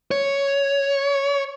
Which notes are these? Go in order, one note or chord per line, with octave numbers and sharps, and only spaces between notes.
C#5